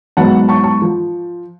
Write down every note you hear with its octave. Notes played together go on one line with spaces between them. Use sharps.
G#2 F#3 B3 F#5 A5
A5 C#6
A5 C#6
F3